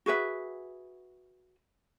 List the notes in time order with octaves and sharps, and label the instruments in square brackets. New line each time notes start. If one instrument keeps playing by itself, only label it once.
[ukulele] F#4 G#4 B4 E5